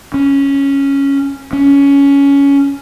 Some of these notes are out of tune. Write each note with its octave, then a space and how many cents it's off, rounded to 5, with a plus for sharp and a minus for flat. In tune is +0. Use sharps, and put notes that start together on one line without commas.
C#4 +0
C#4 +15